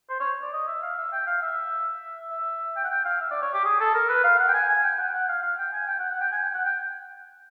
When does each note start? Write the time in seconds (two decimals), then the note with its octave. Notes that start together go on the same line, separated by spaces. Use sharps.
0.09 C5
0.20 C#5
0.42 D5
0.53 D#5
0.68 E5
0.83 F5
0.97 E5
1.13 G5
1.27 F5
1.42 E5
2.31 E5
2.76 G5
2.84 F#5
2.90 G5
3.05 F5
3.21 E5
3.31 D5
3.42 C#5
3.54 G4
3.65 G#4
3.80 A4
3.94 A#4
4.09 B4
4.24 F5
4.39 F#5
4.48 G5
4.54 G#5
4.69 G#5
4.83 G5
4.98 F#5
5.07 G5
5.14 F#5
5.28 F5
5.42 F5
5.58 G5
5.73 G#5
5.87 G5
5.99 F#5
6.10 F#5
6.21 G5
6.32 G#5
6.43 G5
6.54 F#5
6.65 G5